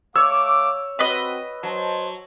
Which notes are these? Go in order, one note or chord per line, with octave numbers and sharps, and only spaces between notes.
A3 C#5 F5 D6 E6
C4 F#4 B4 D#5
F#3 C5 A5